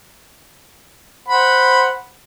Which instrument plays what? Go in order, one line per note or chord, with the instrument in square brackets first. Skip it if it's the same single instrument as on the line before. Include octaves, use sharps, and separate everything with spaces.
[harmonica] C5 F#5 B5